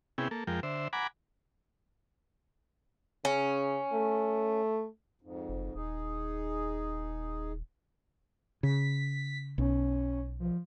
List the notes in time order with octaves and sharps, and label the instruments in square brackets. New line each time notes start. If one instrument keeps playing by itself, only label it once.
[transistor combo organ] C3 B3 C#4 E4 G#4 G5
A#3 A4
F2 F3 G#3 A#4 G5
D3 C5 E5
F#5 G#5 A#5 B5 D6
[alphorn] C#3 [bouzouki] C#4
[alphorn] A3
[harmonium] F2 G#2
[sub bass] F#1
[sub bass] D#1 [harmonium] D#4 G#4
[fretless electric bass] C#3 [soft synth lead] B6
[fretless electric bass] B1 [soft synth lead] C#4
[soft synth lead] F3